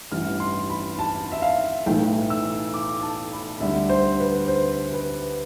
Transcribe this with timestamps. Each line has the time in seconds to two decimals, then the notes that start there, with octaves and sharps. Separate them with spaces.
0.12 A1 G2 E3 F6
0.40 C6
0.70 B5
0.99 A5
1.32 E5
1.42 F5
1.86 B1 A2 E3 A3 G5
2.30 E6
2.74 D6
3.02 A5
3.32 B5
3.60 D2 D3 G3 E5
3.89 C5
4.20 B4
4.48 C5
4.92 B4